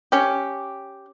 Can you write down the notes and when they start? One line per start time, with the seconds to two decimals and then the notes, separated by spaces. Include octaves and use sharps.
0.12 C#4 G4